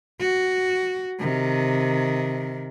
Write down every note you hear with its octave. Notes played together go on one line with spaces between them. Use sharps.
F#4
C3 D#3